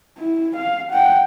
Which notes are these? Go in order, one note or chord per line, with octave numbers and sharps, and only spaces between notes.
E4
F5
F#5 G5